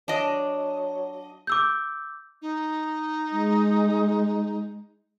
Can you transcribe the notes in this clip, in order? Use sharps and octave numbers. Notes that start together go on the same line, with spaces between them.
F#3 D4 D#5
D6 E6 G6
D#4
G#3